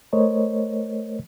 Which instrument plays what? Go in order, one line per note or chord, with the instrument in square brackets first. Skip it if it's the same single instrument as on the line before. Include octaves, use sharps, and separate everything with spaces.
[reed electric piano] A3 A#4 C5 C#5 D#5